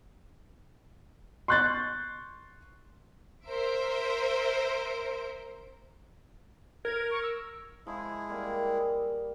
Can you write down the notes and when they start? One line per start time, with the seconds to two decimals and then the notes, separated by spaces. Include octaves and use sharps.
1.48 C6 C#6 F#6 G6 A6
3.47 A#4 C5 E5 D7
6.85 A#4 G#6
7.11 C#6
7.23 E6
7.87 F3 G#3 E4 G#4 E5
8.29 G3 A#3 A#4